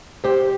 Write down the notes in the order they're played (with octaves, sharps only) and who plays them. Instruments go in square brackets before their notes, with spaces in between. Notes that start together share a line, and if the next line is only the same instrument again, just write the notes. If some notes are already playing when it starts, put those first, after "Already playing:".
[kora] G4 [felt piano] C5